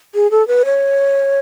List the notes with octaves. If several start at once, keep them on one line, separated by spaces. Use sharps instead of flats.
G#4
A4
B4
C#5